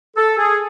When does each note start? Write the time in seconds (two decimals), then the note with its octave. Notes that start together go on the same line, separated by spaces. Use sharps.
0.16 A4
0.38 G#4